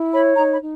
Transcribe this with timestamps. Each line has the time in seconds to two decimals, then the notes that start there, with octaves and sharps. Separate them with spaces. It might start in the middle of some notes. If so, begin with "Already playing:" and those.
Already playing: E4
0.13 C#5 B5
0.37 D#4 A#5
0.52 B5
0.61 D#4